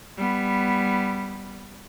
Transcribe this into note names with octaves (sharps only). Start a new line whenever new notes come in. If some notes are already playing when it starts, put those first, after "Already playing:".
G3 B3